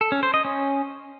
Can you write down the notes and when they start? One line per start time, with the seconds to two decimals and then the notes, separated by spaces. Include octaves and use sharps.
0.01 A4
0.12 C#4
0.23 C5
0.34 D#5
0.45 C#4